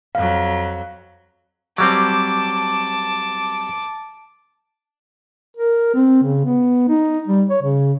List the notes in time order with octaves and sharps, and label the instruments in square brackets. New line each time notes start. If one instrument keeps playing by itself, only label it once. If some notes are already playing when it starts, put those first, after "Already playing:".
[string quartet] F2 F#3 [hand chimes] F5
[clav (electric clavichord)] F#3 G3 C4 [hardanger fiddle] A5 D6
[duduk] A#4
C4
C#3
B3
D#4
G3
C#5
C#3